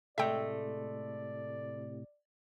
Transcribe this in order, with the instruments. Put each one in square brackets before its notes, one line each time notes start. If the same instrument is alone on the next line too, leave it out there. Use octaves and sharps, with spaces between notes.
[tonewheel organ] A2 C3 [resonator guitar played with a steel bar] G#3 A3 A4 [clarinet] D5 [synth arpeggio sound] E5 G5